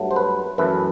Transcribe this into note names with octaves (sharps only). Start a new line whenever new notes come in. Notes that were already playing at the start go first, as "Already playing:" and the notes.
Already playing: G2 F#3 A3
C5
B4
F#2 E3 A3 B4